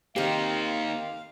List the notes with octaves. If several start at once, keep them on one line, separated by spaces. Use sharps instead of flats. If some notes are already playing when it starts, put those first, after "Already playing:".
D#3 A#3 C4 D#4 G4 F5